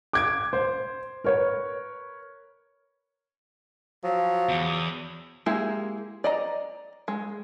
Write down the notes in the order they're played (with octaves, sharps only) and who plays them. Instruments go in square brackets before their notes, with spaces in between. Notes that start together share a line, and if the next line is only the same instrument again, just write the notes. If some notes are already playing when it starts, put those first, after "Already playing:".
[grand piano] D6 G#6 D7
C5
A#4 B4 C#5
[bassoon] F3 [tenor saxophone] F#3
[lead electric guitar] E2
[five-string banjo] G#3 A#3 E4 G4 G#4
D5 D#5 A#5
G#3